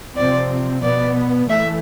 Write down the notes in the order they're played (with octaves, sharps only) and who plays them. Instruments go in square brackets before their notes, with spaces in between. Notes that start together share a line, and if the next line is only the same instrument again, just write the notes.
[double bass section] C3 F3 C4 [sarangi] D5
[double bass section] B2 B3 [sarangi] D5
[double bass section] E3 A3 [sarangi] E5